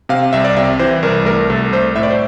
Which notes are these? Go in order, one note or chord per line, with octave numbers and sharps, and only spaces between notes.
C3 F5
C2 E5
D5
C3 E5
E3 C5
C2 A#4
A3 A#4
C2 A4
A3 C5
A2 E5
D5
C5